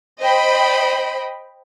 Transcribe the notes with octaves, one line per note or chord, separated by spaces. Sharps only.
C5 D#5 G5 B5